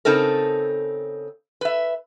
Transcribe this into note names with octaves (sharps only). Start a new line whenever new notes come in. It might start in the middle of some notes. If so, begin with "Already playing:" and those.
C#3 C4 D#4 A4 A#4
B4 E5